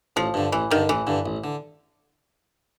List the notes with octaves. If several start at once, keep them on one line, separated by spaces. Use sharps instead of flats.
A1 F3
G2 D3
A1 E3
G2 D3 D#3
A1 E3
G2 D3
A1
D3